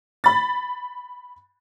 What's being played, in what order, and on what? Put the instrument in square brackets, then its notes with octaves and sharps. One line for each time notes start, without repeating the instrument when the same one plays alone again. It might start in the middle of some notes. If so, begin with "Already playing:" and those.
[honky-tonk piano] B5 A6